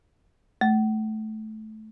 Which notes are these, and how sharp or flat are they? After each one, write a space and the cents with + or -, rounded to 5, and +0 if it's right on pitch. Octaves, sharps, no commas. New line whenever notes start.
A3 -15